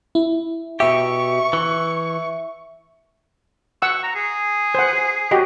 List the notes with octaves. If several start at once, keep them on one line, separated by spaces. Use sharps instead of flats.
E4
B2 G4 E5 C#6
E3
F#5 C#6 E6
A#5
G#4
C5 F#5
F#4 G4 D#5